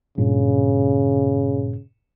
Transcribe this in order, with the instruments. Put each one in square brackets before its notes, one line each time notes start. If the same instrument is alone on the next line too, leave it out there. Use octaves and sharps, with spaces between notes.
[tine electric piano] G2 A#2 [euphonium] C#3